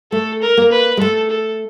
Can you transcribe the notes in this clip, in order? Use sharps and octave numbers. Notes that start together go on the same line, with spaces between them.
A3 A4
A#4
A#3
B4
G#3
A3 A4
A4